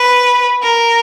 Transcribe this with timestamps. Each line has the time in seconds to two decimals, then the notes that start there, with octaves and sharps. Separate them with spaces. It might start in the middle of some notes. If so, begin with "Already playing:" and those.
Already playing: B4
0.63 A#4